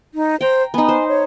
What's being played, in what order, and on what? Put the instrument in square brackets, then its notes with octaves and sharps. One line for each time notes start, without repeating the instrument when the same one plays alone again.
[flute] D#4
[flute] C5 [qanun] G5 A#5
[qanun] B3 D#4 [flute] G#5
[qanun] C5
[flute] C#5